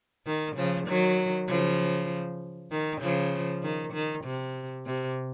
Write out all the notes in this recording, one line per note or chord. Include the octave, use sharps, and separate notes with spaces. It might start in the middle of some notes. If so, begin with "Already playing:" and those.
D#3
C#3 F3
D#3 F#3
C#3 F3
D#3
C#3 F3
D#3
D#3
C3
C3